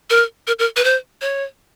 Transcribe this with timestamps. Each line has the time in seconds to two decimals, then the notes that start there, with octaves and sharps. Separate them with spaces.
0.10 A#4
0.47 A#4
0.59 A#4
0.76 B4
0.84 C5
1.21 C#5